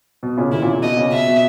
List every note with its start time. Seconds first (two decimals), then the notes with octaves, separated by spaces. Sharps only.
0.23 B2
0.37 A#2 C#3
0.52 B2 D#3 E4
0.62 A#2 C#3
0.72 A#2
0.82 B2 D#5
0.97 A#2 C#3
1.12 B2 E5
1.27 B2